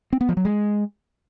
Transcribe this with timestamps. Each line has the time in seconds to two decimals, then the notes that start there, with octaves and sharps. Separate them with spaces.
0.13 C4
0.21 B3
0.29 F3
0.37 F#3
0.45 G#3